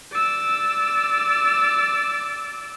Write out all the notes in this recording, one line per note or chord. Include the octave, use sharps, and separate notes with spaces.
D5 E6